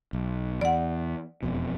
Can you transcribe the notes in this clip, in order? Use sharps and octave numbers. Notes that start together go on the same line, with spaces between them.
B1
E2 D5 F#5
E1 F2 B2